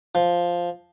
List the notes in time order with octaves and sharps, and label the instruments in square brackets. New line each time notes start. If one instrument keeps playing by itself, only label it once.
[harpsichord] F3